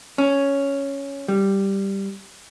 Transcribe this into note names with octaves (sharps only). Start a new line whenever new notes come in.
C#4
G3